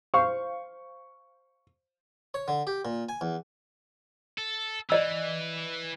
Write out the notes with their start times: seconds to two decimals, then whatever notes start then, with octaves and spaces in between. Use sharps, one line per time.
0.14 C5 F5 C#6
2.34 C#5
2.48 D3
2.67 G4
2.85 A#2
3.09 G#5
3.21 E2
4.38 A4
4.90 E3 D5 D#5 E6